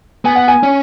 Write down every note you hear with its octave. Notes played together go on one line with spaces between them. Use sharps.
B3 G#5
F#5
G#5
C#4